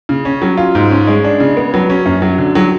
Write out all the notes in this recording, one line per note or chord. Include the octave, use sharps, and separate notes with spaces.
C#3
C#4
F#3
F4
G#2
C#4
G#3
D4
C#3
B3
F#3
C#4
F#2
F#3
D3
F#3